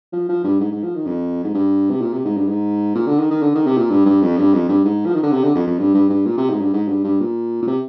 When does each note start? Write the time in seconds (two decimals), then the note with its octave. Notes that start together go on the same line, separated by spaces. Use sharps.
0.13 F3
0.29 F3
0.44 G2
0.60 G#2
0.72 G#2
0.83 F3
0.95 D#3
1.07 F2
1.44 G#2
1.54 G2
1.91 C3
2.01 A#2
2.13 C3
2.25 G#2
2.37 G2
2.49 G#2
2.95 A#2
3.07 D3
3.19 D#3
3.31 D#3
3.42 D3
3.55 D#3
3.66 C3
3.78 A#2
3.90 G2
4.06 G2
4.22 F2
4.38 G2
4.53 F2
4.69 G2
4.84 G#2
5.06 F3
5.14 D#3
5.23 D3
5.32 C3
5.43 D3
5.55 F2
5.67 F2
5.79 G2
5.94 G2
6.10 G2
6.25 A#2
6.37 C3
6.50 G#2
6.61 G2
6.73 G#2
6.88 G2
7.04 G2
7.20 A#2
7.62 A#2
7.67 C3